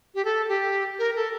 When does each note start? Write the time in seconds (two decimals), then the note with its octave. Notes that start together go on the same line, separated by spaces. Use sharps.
0.15 G4
0.25 A4
0.48 G4
0.99 A#4
1.16 A4